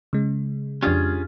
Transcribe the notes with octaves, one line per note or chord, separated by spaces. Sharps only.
C#3 G#3
F2 C#4 D4 F4 G4 G#4